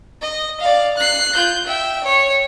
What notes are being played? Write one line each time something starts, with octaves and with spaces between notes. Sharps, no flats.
D#5
D5 F5
F#6 C7
F4 G6
E5 G5
C#5